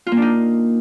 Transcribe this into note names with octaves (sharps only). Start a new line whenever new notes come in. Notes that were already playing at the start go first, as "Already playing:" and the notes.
F4
A#3
D4
D#4